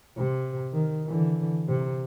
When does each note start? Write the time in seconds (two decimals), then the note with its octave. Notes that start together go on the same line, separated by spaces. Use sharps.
0.18 C3
0.73 D#3
1.05 D3 E3
1.68 C3